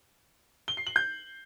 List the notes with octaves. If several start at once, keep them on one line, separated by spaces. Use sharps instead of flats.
G7
C7
F#7
G6